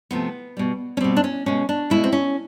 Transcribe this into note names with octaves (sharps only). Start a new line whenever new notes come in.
C3 F3 A3 B3
B2 G3
C#4
B2 G3 C4
D4
C#4
B2 G#3 C#4
D4
B2 G#3 E4
C4
C#4